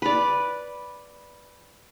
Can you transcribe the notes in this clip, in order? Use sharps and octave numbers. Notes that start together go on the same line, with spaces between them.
B4 D5